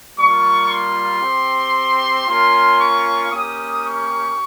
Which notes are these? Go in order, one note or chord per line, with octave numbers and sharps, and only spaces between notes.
G3 A#3 F4 C#6
C6
C4 G4
A#3 C#4 F4 C6
C#6
A#3 C#4 G4 D#6
C#6